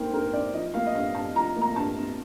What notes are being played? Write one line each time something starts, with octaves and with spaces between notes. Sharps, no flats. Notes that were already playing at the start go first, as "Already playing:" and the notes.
Already playing: G2 D#3 A#3 A#4 C5 G5
G2 A#4
G2 D5
F3 D#5
A#3 F5
D#5
G2 F5
G2 A5
F3 A#5
A#3
A#5
G2 A5
G2